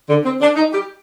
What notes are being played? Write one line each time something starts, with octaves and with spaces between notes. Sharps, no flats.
D3
C4
D4
D#4
G4